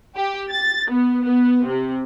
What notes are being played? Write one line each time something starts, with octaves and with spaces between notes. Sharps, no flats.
G4
A6
B3
B3
C3